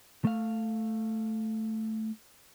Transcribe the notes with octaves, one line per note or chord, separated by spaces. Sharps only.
A3 F5